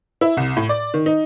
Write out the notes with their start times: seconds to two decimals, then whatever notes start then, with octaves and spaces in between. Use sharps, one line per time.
0.21 E4
0.37 C2
0.57 A2
0.69 D5
0.94 D#3
1.06 D#4